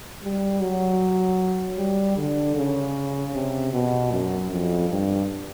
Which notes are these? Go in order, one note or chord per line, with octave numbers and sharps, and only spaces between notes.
G3
F#3
G3
D3
C#3
C3
B2
F#2
F2
G2